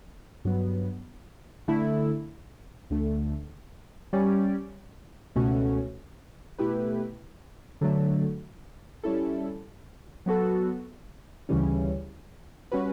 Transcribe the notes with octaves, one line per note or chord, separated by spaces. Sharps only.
G2 F#3 B3
D3 A3 E4
D2 D3 A3
G3 C#4 G4 D5
C#2 B2 A3 C#4 F#4
B2 A3 E4 G4 B4
D3 F#3 A3
G3 C#4 E4 A4
F#3 B3 F#4 A4
D2 C#3 E3 G3 C#4
G3 C#4 F#4 B4